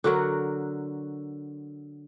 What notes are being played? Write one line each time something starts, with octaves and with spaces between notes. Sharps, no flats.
D3 F#3 F#4 A#4